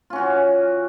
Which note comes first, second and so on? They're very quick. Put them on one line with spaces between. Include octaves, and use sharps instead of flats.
F4 C#4 F#4 E3